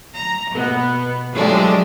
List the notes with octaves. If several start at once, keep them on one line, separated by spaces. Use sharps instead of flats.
A#5
B2 B3
F3 F#3 G#3 A3 D4 G4